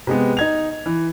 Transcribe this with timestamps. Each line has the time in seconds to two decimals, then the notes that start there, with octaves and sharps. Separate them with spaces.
0.07 C3 G#3 B3
0.37 D#4 G#6 F7
0.86 E3